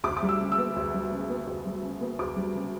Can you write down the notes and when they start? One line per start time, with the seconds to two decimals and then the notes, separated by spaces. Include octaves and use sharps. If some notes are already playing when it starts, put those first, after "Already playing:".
0.04 D2 D6
0.17 D6
0.23 G3
0.29 E6
0.40 C#3
0.52 E6
0.58 B3
0.76 D2
0.94 G3
1.12 C#3
1.29 B3
1.47 D2
1.66 G3
1.83 C#3
2.01 B3
2.19 D2 D6
2.36 G3
2.55 C#3